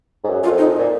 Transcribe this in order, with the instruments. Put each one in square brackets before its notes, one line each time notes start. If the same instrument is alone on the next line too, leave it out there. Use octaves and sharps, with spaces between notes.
[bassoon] G#2
F#2
[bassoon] F#2 [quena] F4
[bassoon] F2
[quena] D#4
[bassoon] A#2